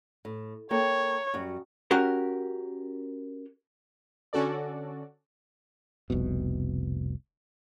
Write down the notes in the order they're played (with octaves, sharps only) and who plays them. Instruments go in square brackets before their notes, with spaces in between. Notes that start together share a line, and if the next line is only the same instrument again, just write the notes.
[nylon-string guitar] A2
[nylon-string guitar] A#3 A4 G5 [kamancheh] C#5
[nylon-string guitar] F#2 G3 F#4
[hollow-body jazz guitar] C#4 F#4 G4 A#4
[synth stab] D3 C#4 F#4 A4 D5
[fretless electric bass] F1 C2 B2